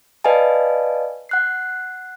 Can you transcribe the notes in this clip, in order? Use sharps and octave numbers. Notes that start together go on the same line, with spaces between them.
B4 D5 D#5 F5 G#5 A5
F#5 F#6 C7